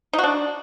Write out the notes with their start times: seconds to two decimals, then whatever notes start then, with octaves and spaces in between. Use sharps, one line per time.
0.13 D#4
0.18 F#4
0.23 D4